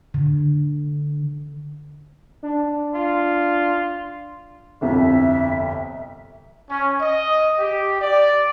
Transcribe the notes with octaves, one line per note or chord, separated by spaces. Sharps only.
D3
D4
F4
G1 C2 F2 E5
C#4
D#5
G4
D5